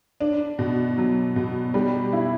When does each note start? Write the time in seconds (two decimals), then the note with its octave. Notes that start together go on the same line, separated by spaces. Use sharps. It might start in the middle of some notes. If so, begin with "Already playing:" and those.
0.20 D4
0.59 B2
0.98 F#3
1.36 B2
1.74 G3
2.13 E4